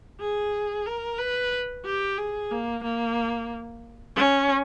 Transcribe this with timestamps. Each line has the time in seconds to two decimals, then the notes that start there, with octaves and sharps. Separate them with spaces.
0.20 G#4
0.86 A#4
1.18 B4
1.85 G4
2.18 G#4
2.51 A#3
2.83 A#3
4.16 C#4